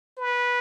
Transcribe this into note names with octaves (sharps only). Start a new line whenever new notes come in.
B4